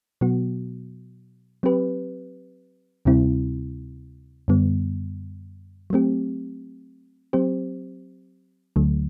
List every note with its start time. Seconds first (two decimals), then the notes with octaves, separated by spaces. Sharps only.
0.21 B2 F#3 B3 F#4
1.63 F#3 C4 G4 B4
3.05 D2 C3 G3 C4 E4
4.48 F#2 D3 G3 B3
5.90 F#3 A3 C4 G4
7.33 F#3 C4 G4 C5
8.76 D2 D3 F#3 A3